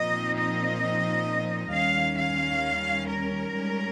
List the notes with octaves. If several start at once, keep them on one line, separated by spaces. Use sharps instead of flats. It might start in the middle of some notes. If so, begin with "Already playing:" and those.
Already playing: A#2 F3 C4 D#4 D#5
D#5
D#2 D#3 G3 C#4 F5
F5
A#4
G#2 G3 C#4